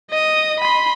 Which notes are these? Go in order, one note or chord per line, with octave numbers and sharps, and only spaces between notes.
D#5 D#6
B5 C6